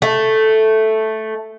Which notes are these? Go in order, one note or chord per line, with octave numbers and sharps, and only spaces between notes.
A3